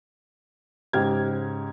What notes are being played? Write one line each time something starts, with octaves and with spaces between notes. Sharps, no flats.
G#2 C#3 G4 F6 G#6